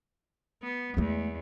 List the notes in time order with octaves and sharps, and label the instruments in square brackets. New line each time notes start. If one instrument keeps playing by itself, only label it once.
[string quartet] B3
[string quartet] E2 [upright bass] G#3 A3